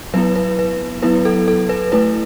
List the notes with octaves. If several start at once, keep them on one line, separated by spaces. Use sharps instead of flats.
F#3 B3 E4 B4
B4
B4
F#3 B3 E4 B4
A4
A4
B4
A3 E4 B4